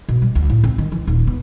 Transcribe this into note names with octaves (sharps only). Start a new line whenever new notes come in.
B2
G3
D2
A2
C4
D#3
E3
D#1
B3